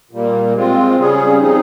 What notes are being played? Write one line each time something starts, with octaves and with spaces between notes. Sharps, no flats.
A#2 G3 A#3
G#3 C4 F4
C#3 G3 C#4 G#4
F3 C4 D#4 G#4